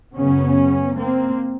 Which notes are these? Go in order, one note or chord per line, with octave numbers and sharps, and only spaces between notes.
F#2 C#3 B3 C#4
A#3 C4